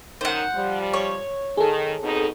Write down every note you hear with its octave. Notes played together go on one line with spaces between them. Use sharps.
F#2 D#3 C5 F#5
F3 G3
C#5
D#3 G#4 A4
B2 C4 D#4